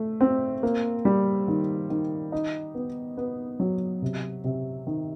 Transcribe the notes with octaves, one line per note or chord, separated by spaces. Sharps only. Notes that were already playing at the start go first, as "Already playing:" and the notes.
Already playing: A3
C4
A#3
G3
D#3
D#3
D#4
B3
B3
F#3
C3
C3
D#3